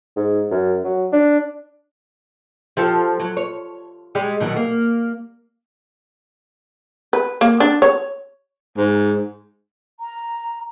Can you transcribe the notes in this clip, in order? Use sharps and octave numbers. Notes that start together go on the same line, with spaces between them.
G#2
F#2
F#3
D4
F3 G4 A4
F#3
C#5
G3 G#3 G4
B2 D#3 F#3
A#3
B4
A#3
D4
C#5
G#2
A#5